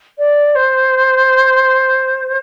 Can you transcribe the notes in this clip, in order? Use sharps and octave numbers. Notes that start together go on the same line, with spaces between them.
D5
C5